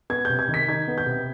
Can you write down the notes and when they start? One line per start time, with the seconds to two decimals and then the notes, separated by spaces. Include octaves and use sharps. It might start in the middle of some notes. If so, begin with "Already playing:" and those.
0.10 B3 G#6
0.25 C3 G6
0.39 G#6
0.48 D#3
0.54 B6
0.68 D#4 G#6
0.88 B3
0.98 G6
1.06 C3